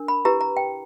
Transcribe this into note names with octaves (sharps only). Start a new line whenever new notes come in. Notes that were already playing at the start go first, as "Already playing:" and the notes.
Already playing: D4 A#4
B5
E4 G4 B4 A#5
A#5
G5